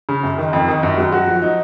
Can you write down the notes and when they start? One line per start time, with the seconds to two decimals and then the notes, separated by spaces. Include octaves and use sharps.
0.09 C#3
0.23 F#2
0.38 D#3
0.53 F2
0.68 D#3
0.83 F#2
0.98 F#3
1.12 F#4
1.27 F3
1.42 D#4